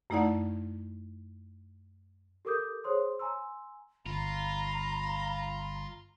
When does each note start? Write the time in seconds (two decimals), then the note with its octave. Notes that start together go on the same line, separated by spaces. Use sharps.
0.10 F#2 A3 D#4 E4 D5 F#5
2.45 G4 A4 A#4 D6 D#6 G6
2.84 G#4 C5 C#5 C6 D#6
3.19 G#5 A#5 C6 E6
4.06 G1 F4 A#5 B5